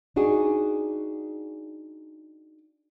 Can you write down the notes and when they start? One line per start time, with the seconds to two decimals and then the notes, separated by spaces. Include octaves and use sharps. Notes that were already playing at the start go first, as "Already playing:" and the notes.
0.16 D4 D#4 F#4 G#4